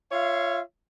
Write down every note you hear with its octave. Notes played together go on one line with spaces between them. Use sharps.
F4 C#5 E5 F5